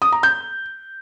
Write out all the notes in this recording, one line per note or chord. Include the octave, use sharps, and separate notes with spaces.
D#6
A#5
G6